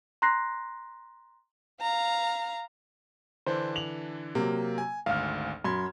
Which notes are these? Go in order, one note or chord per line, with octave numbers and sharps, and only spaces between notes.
A#5 C6 F#6 A#6 C7
F5 A#5
D3 E3 D4 C5
F7 F#7
C3 F#3 A#3
G#5
G#1 D2 F5 F6
F#2 B5 C6 G#6